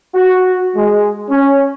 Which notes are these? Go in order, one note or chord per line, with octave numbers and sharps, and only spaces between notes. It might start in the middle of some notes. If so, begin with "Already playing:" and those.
F#4
G#3
C#4